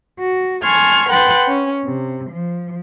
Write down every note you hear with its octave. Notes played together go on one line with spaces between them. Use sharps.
F#4
G#5 A5 C6 C#6 F6 G#6
B4 F#5 G5 C6 F#6 A6
C#4
C3
F3